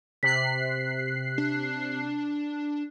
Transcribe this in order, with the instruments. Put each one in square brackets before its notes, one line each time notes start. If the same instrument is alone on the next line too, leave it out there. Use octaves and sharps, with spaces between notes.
[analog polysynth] C3 F#6 C7 [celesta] B6
[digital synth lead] D4